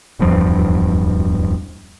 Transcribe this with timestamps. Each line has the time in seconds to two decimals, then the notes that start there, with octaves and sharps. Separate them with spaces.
0.19 D1 E2 G2 F3